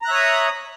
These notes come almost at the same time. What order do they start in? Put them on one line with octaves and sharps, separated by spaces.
A#5 F#6 E5 C#5 D#6